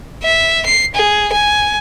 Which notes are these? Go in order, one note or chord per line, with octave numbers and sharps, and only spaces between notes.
E5
C7
G#4
G#5